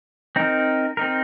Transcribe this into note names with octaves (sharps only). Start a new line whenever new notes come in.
C4 D#4 A#4
C4 D#4 A#4